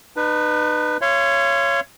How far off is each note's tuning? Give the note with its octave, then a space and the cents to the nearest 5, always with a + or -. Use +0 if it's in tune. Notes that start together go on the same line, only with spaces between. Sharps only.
D#4 -40 B4 +0
C#5 +0 F5 -40 C6 -25